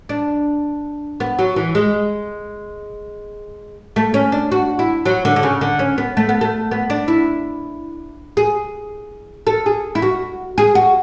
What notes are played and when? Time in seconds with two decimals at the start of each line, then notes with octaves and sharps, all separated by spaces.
0.09 D4
1.20 B3
1.39 F#3
1.56 E3
1.75 G#3
3.96 A3
4.14 C#4
4.32 D4
4.52 F#4
4.79 E4
5.06 F#3
5.25 D3
5.36 D3
5.43 C#3
5.61 D3
5.79 C#4
5.98 B3
6.17 A3
6.29 B3
6.41 A3
6.71 B3
6.90 D4
7.08 E4
8.37 G#4
9.47 A4
9.66 G#4
9.95 E4
10.02 F#4
10.58 G#4
10.75 F#4